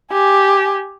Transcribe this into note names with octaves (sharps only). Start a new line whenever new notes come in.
G4 G#5